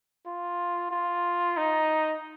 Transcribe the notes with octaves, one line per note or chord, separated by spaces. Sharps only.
F4
F4
D#4